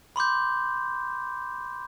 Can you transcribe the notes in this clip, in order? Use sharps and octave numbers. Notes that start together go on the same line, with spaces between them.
B5 C6 D6 G6